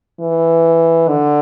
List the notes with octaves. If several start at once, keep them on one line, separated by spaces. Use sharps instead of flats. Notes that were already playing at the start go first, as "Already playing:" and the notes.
E3
D3